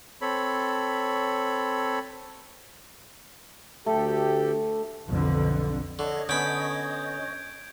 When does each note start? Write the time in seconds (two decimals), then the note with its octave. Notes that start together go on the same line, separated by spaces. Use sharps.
0.21 C4 A4 C#5 B5
3.86 D2 A3 G4 A4
5.06 B1 F2 D3
5.99 D3 C#5 D#5
6.29 D3 B3 C#4 B5 G6 G#6 D7